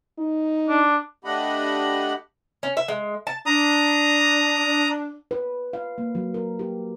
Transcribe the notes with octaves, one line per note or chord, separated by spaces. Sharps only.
D#4
D4
A3 D4 G4 D#5 F#5 B5
C#4
E5
G#3
A5
D4 A#5 D#6
B4
F5
A#3
F#3
A#4
G4